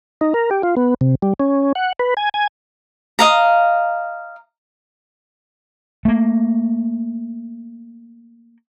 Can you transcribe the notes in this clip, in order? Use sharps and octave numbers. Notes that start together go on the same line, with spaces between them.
D#4
A#4
G4
F4
B3
C3
G3
C#4
F#5
B4
G#5
G#5
D#5 F5 A#5
A3 A#3